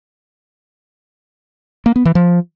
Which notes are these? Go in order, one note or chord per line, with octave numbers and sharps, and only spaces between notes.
A#3
B3
E3
F3